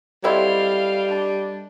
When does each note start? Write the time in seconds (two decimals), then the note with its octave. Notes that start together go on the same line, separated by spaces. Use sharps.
0.24 F#3 G3 C4 E4 A4 D#5 F5
1.08 D4